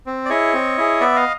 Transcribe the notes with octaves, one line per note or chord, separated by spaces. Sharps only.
C4
D5
E4 G#4 C#5 D#5
C4
E4 G#4
B3 D5 E5
D#5 F5